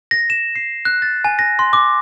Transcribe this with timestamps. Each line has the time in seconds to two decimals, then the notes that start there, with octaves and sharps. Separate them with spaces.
0.11 A#6
0.30 E7
0.55 C7
0.85 F#6
1.02 A6
1.25 G#5
1.39 A#6
1.59 C6
1.73 D6